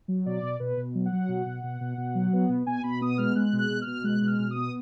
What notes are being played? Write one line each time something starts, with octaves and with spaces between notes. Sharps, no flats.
F#3
B2 D5
B2
B2 B4
B2
F#3
F#5
F#3
B2
B2
B2
B2
B2
F#3
B3
B2
B2 G#5
B2 B5
B3 D#6
G#3 F6
G#3 F#6
B2
F#6
B2
F6
B2
G#3 F#6
B2 F#6
F6
B2
D#6
B3